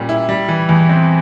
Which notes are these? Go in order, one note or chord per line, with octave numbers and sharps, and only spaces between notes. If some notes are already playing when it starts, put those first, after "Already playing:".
Already playing: A#2 G3 C#4
E4
G3
E3
E2
C4